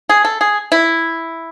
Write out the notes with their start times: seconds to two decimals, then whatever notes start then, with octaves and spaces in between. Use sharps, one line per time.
0.09 G#4
0.25 A4
0.41 G#4
0.72 E4